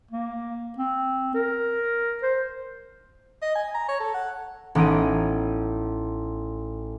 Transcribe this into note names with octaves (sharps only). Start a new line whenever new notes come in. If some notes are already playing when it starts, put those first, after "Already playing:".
A#3
C4
A#4
C5
D#5
G#5
A#5
C#5
A4
F#5
A1 B3 D#4 D7 D#7